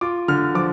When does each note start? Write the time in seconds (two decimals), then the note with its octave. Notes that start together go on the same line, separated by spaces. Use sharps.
0.01 F4 D6
0.28 D3 F6
0.55 F3 D6